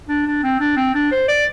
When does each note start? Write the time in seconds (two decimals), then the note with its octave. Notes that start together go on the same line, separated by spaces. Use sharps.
0.08 D4
0.26 D4
0.43 C4
0.60 D4
0.76 C4
0.95 D4
1.12 C5
1.28 D5